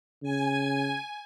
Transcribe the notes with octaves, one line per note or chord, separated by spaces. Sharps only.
C#3 G#5